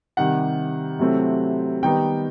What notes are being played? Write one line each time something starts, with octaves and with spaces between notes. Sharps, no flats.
C3 D#3 G3 F#5
C3 F#3 A3 C4 E4
D#3 G3 B3 D#4 G5